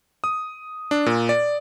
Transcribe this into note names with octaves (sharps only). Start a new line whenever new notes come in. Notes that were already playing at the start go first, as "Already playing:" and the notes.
D#6
D4
A#2
D5